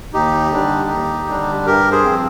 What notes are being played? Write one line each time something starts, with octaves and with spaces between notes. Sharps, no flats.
D#2 D#4 G4
D3 G3 D4
D#2
D3 G3 D4
G2 G4 A#4
G#4 C5
F3 C4